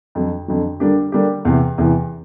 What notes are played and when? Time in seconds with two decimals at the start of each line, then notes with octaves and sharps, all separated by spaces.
0.15 F2 D3 F#3
0.48 F2 D3 F#3
0.80 D3 G3 A#3 D4 G4
1.12 D3 G3 A#3 D4 G4
1.45 E2 C3 E3
1.78 E2 C3 E3